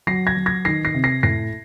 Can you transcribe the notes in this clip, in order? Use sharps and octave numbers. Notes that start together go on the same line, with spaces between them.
F#3 A#6 C7
G#6 A#6
F#3
G#6 A#6
D#3 A#6 C7
A#6 C7
C3
A#6 C7
A2 A#6 C7